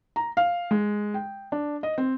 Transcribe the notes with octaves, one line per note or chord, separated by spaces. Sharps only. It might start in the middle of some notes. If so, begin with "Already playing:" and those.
A#5
F5
G#3
G5
D4
D#5
C4